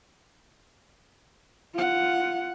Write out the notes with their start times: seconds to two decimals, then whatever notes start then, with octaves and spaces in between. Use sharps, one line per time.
1.74 F4 F#5